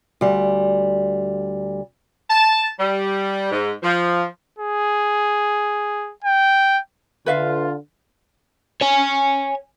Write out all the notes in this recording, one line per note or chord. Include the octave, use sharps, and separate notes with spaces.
D2 G3
A5
G3
G#2
F3
G#4
G5
D3 F4 B4 E5 F5
C#5 G#5